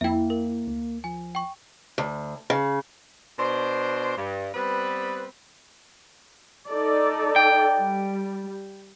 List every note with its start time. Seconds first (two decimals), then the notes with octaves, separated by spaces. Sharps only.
0.01 F2 A#3 E4 E5 G5
0.30 A#4
0.67 D2
1.04 F3 G#5
1.35 G5 C#6
1.98 D2
2.50 C#3
3.39 B2 D4 C5
4.17 G2
4.54 G3 B3 C4 B4
6.69 D#4 A4 D5
7.36 G5
7.79 G3